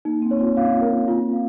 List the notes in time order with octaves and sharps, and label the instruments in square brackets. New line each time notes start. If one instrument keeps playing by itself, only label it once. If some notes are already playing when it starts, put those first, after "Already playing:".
[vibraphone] A#3 [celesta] D#4
[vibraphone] C4
[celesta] C#5
[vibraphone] F4
[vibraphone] C#4 [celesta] F5
[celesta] A#4
F4
F5